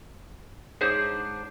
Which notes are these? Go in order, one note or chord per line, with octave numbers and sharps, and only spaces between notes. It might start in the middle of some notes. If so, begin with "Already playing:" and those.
G#2 D4 G#4 C5 C#5